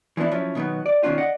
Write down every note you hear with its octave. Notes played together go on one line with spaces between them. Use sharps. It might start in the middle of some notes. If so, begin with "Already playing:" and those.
E3 F3 B3 D4 E4
F3 F#3 C#4 E4
B2 D#3 F3 F#3 B3
D5
B2 D#3 C#4 D4 F4 G4
D5 D#5 F#5